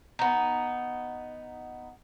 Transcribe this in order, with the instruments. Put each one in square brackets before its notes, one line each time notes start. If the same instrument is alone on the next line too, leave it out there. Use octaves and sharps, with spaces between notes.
[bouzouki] B3 D#4